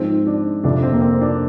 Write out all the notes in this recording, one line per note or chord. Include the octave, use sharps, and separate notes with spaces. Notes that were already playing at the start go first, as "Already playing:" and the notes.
Already playing: G#2 F3 C4
D4
F2 C3 F3 D4
C4
A#3
C4
D4